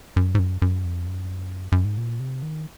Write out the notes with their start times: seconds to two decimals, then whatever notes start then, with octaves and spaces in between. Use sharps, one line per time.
0.16 F#2
0.35 G#2
0.39 F#2
0.62 F#2
0.84 F2
1.07 F#2
1.72 F#2
1.85 G#2
1.97 A#2
2.20 C3
2.42 D#3